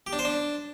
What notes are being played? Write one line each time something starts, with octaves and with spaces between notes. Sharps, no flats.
G4
D4
C5
D4